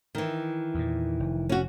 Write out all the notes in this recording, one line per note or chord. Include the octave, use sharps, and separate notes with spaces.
D#3 E3
E2 A#2
F1
C#4 F#4